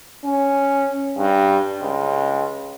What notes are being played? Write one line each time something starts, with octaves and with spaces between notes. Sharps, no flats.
C#4
G2
C#2